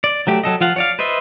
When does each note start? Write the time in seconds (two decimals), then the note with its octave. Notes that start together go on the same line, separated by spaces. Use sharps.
0.04 D5
0.27 F#3 A3 G4
0.44 F#3 A4 D#5
0.61 F3 F4 F5 F#5
0.76 C#5 D5 F5
0.99 B4 C5 D#5 E5